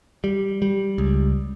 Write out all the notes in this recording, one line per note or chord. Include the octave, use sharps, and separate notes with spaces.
G3
G3
C#2